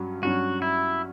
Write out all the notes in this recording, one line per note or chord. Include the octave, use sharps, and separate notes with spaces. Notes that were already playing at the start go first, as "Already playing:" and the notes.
Already playing: G2 F#3 C#4
G2 F#3 C#4 F#4
E4